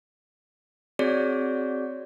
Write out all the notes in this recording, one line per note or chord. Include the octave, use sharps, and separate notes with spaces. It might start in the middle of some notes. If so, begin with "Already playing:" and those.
C4 F#4 G#4 C#5 D5